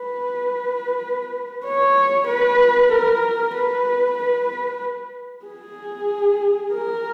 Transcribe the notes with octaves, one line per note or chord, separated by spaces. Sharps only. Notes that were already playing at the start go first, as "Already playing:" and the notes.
Already playing: B4
C#5
B4
A#4
B4
B4
G#4
A#4